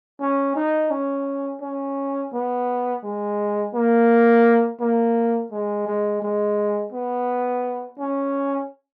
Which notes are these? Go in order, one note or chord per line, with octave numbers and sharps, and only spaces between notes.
C#4
D#4
C#4
C#4
B3
G#3
A#3
A#3
G#3
G#3
G#3
B3
C#4